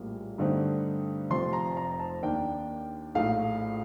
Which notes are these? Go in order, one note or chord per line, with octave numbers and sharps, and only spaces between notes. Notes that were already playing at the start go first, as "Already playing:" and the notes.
Already playing: A#1 A2 G3 A#3
G2 D3 A3 C4 D#4
F1 F2 C3 F3 C6
A#5
A#5
A5
D#2 D#3 A#3 D4 G5
A#1 A2 A3 D#4 F5